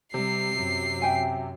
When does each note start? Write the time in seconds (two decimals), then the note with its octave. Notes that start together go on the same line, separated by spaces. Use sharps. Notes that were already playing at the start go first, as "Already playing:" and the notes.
0.14 C3 G3 C7
0.54 F#2
1.02 E5 G5 G#5